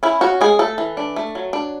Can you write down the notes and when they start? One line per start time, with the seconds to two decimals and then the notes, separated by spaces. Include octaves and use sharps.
0.03 C#4 E4
0.21 C#4 F#4
0.41 G#3 G#4
0.59 A3 A4
0.78 E3
0.97 D4
1.16 A3
1.35 F#3
1.53 D4